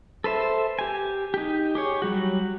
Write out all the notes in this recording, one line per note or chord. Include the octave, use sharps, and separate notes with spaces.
A4 B4 C5 E5
G4 G#5
D#4 G4
G4 G#4 C#5
F#3 G3 F#4